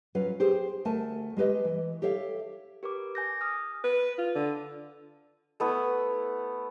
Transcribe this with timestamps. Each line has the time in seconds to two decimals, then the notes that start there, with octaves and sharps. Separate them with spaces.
0.15 F#3 C#4 F4 B4 F5
0.40 G4 G#4 C5
0.85 D2 A3 A#4 G#5 A5
1.37 G#3 G4 B4 D#5
1.65 E3
2.02 G4 A4 C#5 E5 F5
2.83 G4 A#4 B4 D6
3.15 G#5 G6 A#6
3.41 D#6 F6
3.84 B4
4.18 F4
4.35 D3
5.60 A3 B3 E4